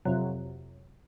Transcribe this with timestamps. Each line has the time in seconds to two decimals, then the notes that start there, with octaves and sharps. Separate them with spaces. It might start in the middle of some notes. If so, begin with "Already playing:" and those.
0.05 F2 C3 F#3